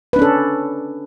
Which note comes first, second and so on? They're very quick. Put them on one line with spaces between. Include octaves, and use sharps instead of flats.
B4 D4 C#4 A4